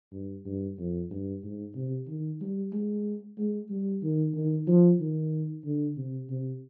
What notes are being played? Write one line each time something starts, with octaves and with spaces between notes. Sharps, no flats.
G2
G2
F2
G2
G#2
C3
D#3
G3
G#3
G#3
G3
D#3
D#3
F3
D#3
D3
C3
C3